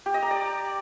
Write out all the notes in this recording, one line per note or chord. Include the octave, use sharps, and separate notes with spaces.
G4
D#5
A#5
D5